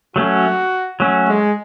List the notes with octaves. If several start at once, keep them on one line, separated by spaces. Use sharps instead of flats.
F#3 A3 C#4 F#4
F#3 A3 C#4
G#3